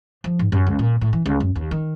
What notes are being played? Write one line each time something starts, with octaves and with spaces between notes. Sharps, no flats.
F3
G#2
F#2
C#2
A#2
A2
E3
C#2
F#2
D#2
D#3